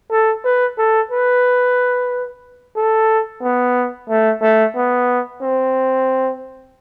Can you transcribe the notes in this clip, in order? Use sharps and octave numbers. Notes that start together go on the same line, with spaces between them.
A4
B4
A4
B4
A4
B3
A3
A3
B3
C4